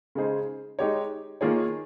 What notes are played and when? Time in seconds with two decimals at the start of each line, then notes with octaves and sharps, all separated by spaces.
0.15 C#3 G#3 D#4 G#4 C5
0.79 G#3 D#4 G4 C#5
1.41 D#3 A#3 F4 G#4 C#5